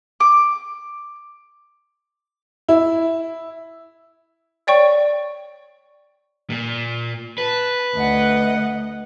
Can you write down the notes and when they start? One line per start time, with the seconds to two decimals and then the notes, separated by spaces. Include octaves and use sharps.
0.20 D6
2.69 E4
4.67 C#5 D5 G5 C#6
6.50 A#2
7.38 B4 A5
7.94 D2 D#5 F#5